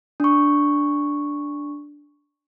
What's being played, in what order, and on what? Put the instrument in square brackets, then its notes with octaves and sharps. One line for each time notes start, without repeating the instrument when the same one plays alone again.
[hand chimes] D4 C#6